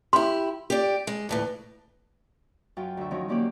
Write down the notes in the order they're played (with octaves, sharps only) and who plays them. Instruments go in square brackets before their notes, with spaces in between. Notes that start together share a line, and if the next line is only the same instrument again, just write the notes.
[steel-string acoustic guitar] E4 G4 [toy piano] C6
[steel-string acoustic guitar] G4 D5
G#3
D2 A2 E3
[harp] F#2 F4 G5
D2 E5
D#3 F3 F#3 C4 C#4
D3 F#3 A#3 C#4 G4 D5